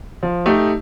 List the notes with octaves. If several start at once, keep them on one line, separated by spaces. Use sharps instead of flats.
F3
A3 D#4 G4